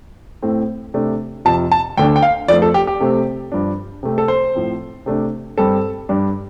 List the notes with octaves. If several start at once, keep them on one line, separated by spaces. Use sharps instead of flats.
A2 A3 C4
C3 A3 D4
F2 C3 F3 A5
A5
D2 D3 A3 D4 G5
G5
F5
F2 F3 A3 D5
A4
G4
G4
C3 A3 C4
G2 F3 D4
C3 A3 C4
A4
C5
A2 F3 C4
C3 A3 D4
G2 G3 C4 A4
G2 G3 D4